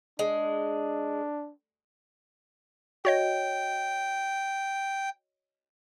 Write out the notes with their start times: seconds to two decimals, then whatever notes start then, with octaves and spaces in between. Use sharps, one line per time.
0.19 G#3 D4
3.05 F#4 C#5 D#5 G5